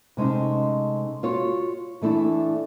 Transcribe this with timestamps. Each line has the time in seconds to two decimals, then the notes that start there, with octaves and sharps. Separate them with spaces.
0.17 C3 G#3 A3 C#4 D#4
1.23 F4 F#4 C#5
2.02 E3 A3 D4 E4